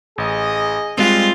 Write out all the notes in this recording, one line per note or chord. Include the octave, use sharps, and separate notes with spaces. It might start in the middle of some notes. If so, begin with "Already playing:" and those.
A1 G#4 D#5
G3 G#3 C4 F4